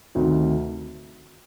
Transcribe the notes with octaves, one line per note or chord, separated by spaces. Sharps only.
D2 C3 D#3